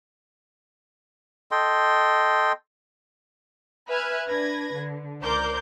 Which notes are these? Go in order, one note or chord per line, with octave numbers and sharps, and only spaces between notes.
A4 D#5 G5 C6
B4 E5 G#5 F6 F#6 G#6
D4 B4 G#6 A#6
D3
C#2 A#4 C5 D5 D6 G6